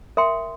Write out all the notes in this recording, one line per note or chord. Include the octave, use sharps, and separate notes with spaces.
A#4 E5 G5 C6